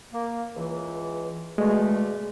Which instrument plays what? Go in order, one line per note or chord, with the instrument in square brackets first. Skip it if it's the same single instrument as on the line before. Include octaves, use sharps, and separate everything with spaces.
[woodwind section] A#3
C#2 E3
[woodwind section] B2 D3 A3 [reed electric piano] G#3